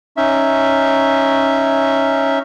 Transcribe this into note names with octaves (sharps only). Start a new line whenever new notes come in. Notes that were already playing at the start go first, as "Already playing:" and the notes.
C#4 D#4 E5